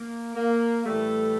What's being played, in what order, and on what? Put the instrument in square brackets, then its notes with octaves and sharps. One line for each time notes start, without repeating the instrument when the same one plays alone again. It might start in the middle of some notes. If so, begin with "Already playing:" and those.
Already playing: [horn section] A#3
A#3
A2 E3 G3 A3